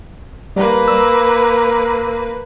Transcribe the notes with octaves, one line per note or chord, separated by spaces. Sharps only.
G3 A#3 B4
E6